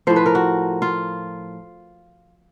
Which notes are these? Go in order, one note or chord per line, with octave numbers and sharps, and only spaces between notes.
A2 F3 C5
B4
A#4
F#4
F4